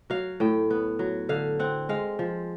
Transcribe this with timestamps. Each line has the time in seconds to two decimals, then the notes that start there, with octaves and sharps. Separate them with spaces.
0.10 F#3 F5
0.40 A2 G5
0.70 B3
0.99 F#3
1.29 D3 F5
1.60 C4 F#5
1.89 G#3 F5
2.19 F3